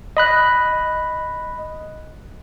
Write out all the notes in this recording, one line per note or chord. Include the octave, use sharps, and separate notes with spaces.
D#5 B5 F#6